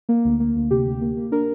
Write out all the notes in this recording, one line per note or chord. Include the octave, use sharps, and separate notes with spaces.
A#3
D2
A#3
D2
C3 G4
D2
A#3
A#3
D4 A#4